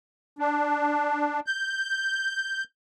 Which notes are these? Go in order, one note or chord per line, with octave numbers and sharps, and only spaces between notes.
D4
G6